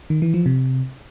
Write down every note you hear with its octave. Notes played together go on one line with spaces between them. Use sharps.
D#3
E3
F3
C3